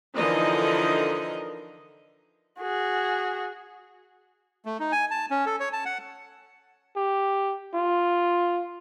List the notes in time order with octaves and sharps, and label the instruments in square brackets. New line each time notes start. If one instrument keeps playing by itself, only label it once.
[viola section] D3 E3 F3 D#4 A#4 D#5
[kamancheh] F#4 G#4
[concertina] A3
D#4
G#5
A5
C#4
A4
C#5
A5
F#5
[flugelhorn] G4
F4